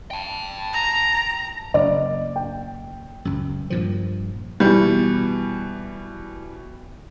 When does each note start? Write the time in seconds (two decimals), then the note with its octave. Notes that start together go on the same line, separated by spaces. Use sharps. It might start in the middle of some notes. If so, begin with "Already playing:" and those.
0.11 G5 A5
0.73 A#5
1.74 F#1 D5 D#5
2.36 G5
3.25 C#2 F#2
3.70 G2 A#2 F3
4.60 B2 E3 G3